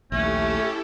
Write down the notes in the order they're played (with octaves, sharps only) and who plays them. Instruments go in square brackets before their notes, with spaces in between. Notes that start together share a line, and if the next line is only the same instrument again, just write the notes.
[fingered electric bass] A#1 D#2 [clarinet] A3 [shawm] C#4 [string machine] E4 G4 A4